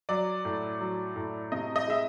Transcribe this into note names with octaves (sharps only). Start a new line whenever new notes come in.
F#3 D5
A2
F#3
A2
C3 D#5
D#5
G#3 E5